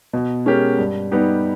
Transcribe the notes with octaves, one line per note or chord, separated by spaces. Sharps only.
B2
G#3 C#4 G4 A#4
G2
G3 B3 D#4 G4